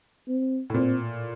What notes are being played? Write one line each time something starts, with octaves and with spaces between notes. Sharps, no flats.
C4
A2
A#2 C4